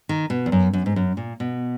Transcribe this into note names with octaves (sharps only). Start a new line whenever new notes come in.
D#3
B2
E2
F#2
F#2
G#2
F#2
A#2
B2